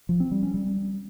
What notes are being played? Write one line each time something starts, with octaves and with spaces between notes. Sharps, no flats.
F3
C4
G3
C#4
G3